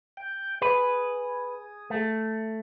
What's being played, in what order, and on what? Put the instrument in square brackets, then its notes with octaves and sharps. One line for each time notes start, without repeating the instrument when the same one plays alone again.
[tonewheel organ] G5
[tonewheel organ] G#4 [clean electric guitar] B4
[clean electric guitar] A3